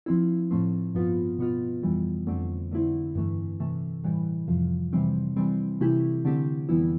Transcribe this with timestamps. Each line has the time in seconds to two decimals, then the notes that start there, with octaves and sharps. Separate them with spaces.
0.06 F3 C4 E4
0.51 A2 F3 A3 C4
0.95 G2 F3 B3 F4
1.39 B2 B3 F4
1.83 F2 E3 G3
2.27 F2 D3 A3 C4
2.72 D3 A3 C4 E4
3.15 G2 E3 A3
3.60 C3 E3 A3
4.04 A2 E3 G3
4.48 F2 C3 F3
4.93 C3 E3 G3 C4
5.36 E3 G3 C4
5.81 C3 E3 A3 E4 G4
6.25 D3 A3 C4 G4
6.69 F2 E3 G3 B3 E4